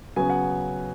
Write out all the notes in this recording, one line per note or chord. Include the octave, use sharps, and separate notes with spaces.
C#3 F#3 B3 G#5
F#5